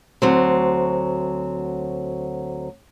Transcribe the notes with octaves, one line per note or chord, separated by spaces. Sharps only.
D2 F#3 C4